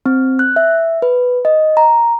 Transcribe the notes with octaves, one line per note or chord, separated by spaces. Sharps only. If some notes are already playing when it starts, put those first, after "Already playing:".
C4
F#6
E5
B4
D#5
A#5